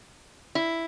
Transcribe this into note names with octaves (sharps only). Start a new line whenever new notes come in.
E4